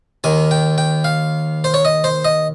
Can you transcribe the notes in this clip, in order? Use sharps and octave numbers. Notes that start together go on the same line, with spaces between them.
D#2 D#3 G#5
G5
G5
F5
C5
C#5
D#5
C5
D#5